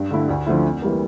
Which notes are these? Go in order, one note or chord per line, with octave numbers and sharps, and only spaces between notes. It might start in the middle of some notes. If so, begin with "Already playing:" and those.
Already playing: G2
D3 A3 E4
D2
D3 F3 A3 E4
F2
E3 G3 A#3